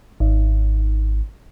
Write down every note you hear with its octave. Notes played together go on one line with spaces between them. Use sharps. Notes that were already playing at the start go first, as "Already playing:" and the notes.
G#1